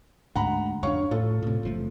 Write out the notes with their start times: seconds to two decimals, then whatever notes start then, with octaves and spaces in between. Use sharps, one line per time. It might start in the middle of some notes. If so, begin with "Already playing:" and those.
0.36 D2 G#2 F#5 A#5 B5
0.83 F2 G3 D4 C#5 F5 C#6
1.11 A2 F4 A4
1.42 A2 C3
1.63 F#1 F3 A3